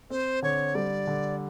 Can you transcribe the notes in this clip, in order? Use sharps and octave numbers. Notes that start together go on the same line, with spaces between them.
C4 C5
D3 C#5
G3 D5
D3